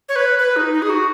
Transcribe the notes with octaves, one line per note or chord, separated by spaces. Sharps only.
C#5
B4
B4
D#4
D#4
G#4
F#4